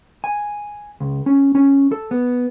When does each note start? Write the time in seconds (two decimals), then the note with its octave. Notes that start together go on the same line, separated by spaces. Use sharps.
0.24 G#5
1.00 C#2
1.26 C#4
1.55 C#4
1.92 A4
2.11 B3